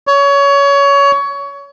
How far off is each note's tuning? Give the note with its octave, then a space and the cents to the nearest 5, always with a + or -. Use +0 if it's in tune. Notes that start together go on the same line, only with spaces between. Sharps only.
C#5 +25